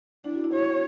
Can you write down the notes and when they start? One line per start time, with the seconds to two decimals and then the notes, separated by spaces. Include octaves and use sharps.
0.24 D4 E4
0.35 F#4
0.44 E4
0.53 F#4 C#5